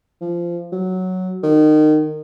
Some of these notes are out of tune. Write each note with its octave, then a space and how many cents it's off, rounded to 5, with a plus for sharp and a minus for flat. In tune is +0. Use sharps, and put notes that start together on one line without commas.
F3 -20
F#3 +0
D#3 -25